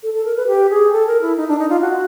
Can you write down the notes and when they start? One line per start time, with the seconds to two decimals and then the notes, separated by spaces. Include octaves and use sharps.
0.03 A4
0.14 A4
0.25 A#4
0.36 B4
0.47 G4
0.70 G#4
0.92 A4
1.07 A#4
1.22 E4
1.37 D#4
1.48 D4
1.59 D#4
1.69 F4
1.81 F#4